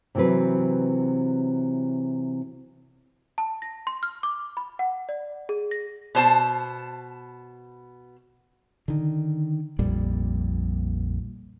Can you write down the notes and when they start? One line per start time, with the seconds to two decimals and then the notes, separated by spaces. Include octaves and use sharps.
0.15 C3 E3 F#3 C4 B4
3.38 A5
3.62 A#6
3.87 C6
4.03 F6
4.23 D6
4.57 B5
4.79 F#5
5.09 D5
5.49 G#4
5.71 A#6
6.15 B2 C5 A5
8.88 D3 D#3
9.79 A#1 F2 A#2 G3